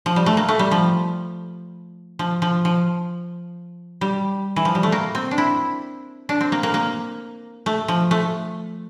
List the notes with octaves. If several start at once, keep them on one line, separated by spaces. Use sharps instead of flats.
F3
G3
A3
A#3
A3
G3
F3
F3
F3
F3
G3
E3
F3
G3
A3
A#3
C4
D4
E4
D4
C4
A#3
A#3
A#3
A3
F3
A3